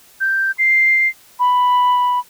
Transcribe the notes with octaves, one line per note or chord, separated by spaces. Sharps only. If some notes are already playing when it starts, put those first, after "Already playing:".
G6
C7
B5